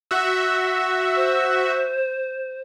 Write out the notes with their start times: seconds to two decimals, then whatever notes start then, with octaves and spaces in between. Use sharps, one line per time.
0.11 F#4 E5
1.16 C5